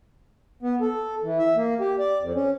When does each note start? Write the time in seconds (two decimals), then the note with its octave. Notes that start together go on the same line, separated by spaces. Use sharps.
0.63 B3
0.81 A4
1.23 E3
1.39 E5
1.56 A#3
1.80 G4
1.99 D5
2.21 F2
2.35 C#4